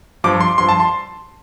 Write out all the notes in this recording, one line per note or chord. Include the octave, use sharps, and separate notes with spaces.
G2 F3 D6
C6
G2 F3 C6
A5
C6